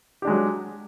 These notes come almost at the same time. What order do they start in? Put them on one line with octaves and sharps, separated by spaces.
G4 D4 G#3 F#3